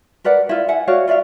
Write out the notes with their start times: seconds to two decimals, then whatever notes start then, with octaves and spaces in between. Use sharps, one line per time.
0.24 A#4 B4 D5 F#5
0.49 E4 F4
0.68 E5 F#5 G#5
0.88 F#4 C#5 D5 F5
1.08 F4 D5 E5 F5